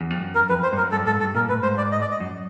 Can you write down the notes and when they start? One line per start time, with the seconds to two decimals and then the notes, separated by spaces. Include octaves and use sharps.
0.01 E2
0.10 F2
0.21 F#2
0.35 A#4
0.49 F2 B4
0.63 C5
0.73 G2
0.77 F#2 A#4
0.91 G2 A4
1.06 G#2 A4
1.20 G2 A4
1.35 A#2 A#4
1.49 A2 B4
1.63 G#2 C5
1.78 D5
1.92 D#5
2.01 D5
2.11 D#5
2.20 F#2